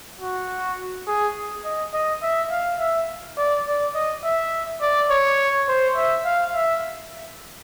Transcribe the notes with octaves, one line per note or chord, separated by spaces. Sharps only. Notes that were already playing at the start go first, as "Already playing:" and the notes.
F#4
G#4
D#5
D#5
E5
F5
E5
D5
D5
D#5
E5
D5
C#5
C5
E5
F5
E5